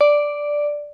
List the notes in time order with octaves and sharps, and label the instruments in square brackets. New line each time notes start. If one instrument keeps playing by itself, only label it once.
[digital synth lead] D5